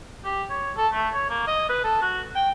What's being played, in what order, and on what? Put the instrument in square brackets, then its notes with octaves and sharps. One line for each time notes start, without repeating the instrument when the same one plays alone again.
[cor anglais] G4
C#5
A4
A3
C#5
A#3
D#5
B4
A4
F#4
G5